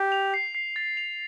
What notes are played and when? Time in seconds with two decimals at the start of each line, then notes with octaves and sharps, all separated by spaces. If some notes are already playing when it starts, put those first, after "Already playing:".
Already playing: G4
0.12 F7
0.34 C7
0.55 C7
0.76 A6
0.97 F7